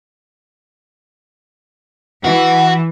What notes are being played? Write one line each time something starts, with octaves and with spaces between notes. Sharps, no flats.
E3 F#4